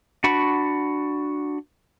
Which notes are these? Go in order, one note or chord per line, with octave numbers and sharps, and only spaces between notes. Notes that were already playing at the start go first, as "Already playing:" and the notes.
D4 F#4 F#5 B5 C#6